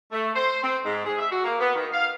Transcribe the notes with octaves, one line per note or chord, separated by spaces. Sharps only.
A3
C5
C4
G#2
G#4
E5
F#4
A#3
B3
D#3
F5